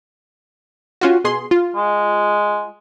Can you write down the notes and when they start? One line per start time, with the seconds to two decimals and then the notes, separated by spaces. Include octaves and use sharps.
1.01 C#4 F4 F#4
1.24 B2 G#4 C6
1.51 F4
1.76 G#3